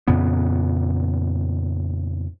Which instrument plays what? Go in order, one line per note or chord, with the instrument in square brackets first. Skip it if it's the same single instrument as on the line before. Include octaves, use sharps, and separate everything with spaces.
[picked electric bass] F2 A#2 C#3 B3